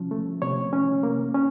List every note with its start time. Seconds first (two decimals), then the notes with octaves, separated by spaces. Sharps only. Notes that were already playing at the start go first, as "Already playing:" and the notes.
Already playing: C3 F3 C#4
0.11 A3
0.42 C3 C#5
0.73 C#4
1.03 A#3
1.34 C#4